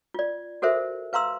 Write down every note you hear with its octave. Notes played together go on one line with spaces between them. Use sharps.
F4 D5
F#4 A4 A#4 C5 E5
B4 F5 A#5 C6 E6